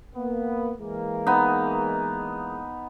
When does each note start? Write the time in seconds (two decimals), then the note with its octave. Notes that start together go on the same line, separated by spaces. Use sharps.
0.15 A#3 B3
0.78 E3 G#3 A#3
1.26 B3 D#4